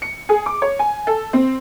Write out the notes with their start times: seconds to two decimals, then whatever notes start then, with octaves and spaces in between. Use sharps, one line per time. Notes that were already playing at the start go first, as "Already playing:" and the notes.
0.02 C#7
0.29 G#4
0.46 D6
0.62 C#5
0.79 G#5
1.07 A4
1.33 C4